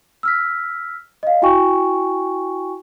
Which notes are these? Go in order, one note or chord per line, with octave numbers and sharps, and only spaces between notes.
E6 F6 B6
D#5 F5
E4 F#4 G5 G#5 C#6